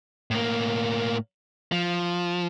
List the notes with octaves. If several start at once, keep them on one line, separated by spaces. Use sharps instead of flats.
A2 A#3
F3